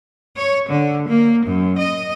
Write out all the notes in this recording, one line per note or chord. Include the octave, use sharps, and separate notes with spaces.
C#5
D3
A#3
F#2
D#5